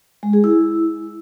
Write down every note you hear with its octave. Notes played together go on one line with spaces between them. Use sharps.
G#3
G#4
E4